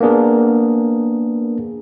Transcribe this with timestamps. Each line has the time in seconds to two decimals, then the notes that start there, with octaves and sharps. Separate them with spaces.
0.01 A#3 B3 D4 G#4 A#4